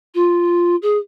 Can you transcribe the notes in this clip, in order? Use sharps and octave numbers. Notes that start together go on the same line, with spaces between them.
F4
G#4